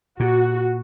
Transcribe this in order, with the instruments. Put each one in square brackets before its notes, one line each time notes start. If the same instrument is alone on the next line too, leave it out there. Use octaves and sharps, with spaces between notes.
[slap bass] A#2 [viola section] F#4